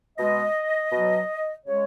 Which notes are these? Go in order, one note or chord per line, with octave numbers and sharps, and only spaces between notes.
B2 G#3 D#5
B2 F#3
C#3 G#3 C#5